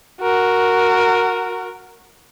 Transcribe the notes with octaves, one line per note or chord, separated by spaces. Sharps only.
F#4 A#4